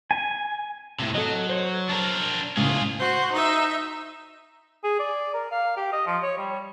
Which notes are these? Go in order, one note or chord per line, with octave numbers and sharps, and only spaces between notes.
G#5
A2 C3
F#3 A4 D#5
C5 C#5
D4 A#4
A2 C#3 G#3 F4 G#4
F#4 C5
D#4 E5
G#4
D5
A#4
F5
G4
D#5
F3
C#5
G3